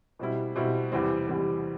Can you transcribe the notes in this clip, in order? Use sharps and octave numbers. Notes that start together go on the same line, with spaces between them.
B2 G3 C4 E4
B2 G3 C4 E4
E2 C3 E3 G3 C4
E2 C3 E3 G3 C4